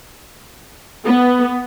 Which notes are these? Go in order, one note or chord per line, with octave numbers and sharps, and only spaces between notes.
B3